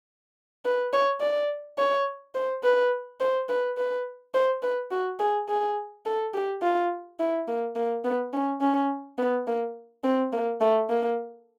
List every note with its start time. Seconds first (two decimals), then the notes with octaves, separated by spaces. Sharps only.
0.65 B4
0.93 C#5
1.21 D5
1.78 C#5
2.35 C5
2.63 B4
3.21 C5
3.49 B4
3.78 B4
4.34 C5
4.63 B4
4.91 F#4
5.20 G#4
5.48 G#4
6.06 A4
6.34 G4
6.62 F4
7.20 E4
7.48 A#3
7.76 A#3
8.05 B3
8.33 C#4
8.61 C#4
9.18 B3
9.47 A#3
10.04 C4
10.33 A#3
10.61 A3
10.90 A#3